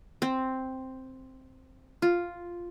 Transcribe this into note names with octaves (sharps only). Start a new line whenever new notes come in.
C4
F4